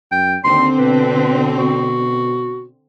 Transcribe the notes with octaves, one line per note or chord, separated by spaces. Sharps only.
F#2 G5
D#2 D3 C4 C6
B2 B4
F#4